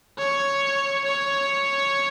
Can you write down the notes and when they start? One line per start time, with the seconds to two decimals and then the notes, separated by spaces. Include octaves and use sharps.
0.18 C#5
1.05 C#5